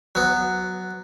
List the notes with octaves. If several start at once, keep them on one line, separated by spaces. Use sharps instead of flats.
F#3 B3